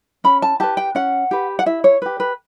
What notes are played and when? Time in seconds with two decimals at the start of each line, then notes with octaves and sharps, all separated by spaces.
0.24 C#4 B5
0.42 A5
0.60 G4 B4 A5
0.77 G5
0.95 C#4 F#5
1.31 G4 B4
1.59 F#5
1.66 E4 E5
1.84 C#5
2.02 G4 B4
2.20 B4